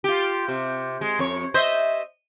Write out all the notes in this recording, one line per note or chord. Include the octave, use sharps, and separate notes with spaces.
F4 G4
C3
G#3
F2 C#5
C5 D#5 E5